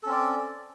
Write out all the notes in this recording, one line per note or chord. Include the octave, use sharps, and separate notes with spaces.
C4 C#4 A4 D5